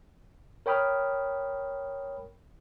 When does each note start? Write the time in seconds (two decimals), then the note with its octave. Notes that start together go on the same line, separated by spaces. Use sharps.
0.66 A#4 C#5 G5 B5 D#6 F6